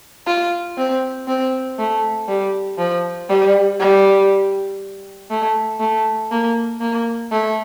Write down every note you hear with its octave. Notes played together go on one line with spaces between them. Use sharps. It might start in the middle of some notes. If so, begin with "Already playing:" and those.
F4
C4
C4
A3
G3
F3
G3
G3
A3
A3
A#3
A#3
A3